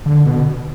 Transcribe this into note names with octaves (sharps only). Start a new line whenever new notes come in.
D3
B2